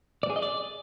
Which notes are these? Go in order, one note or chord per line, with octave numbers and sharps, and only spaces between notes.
D5
G#4
D#5
D5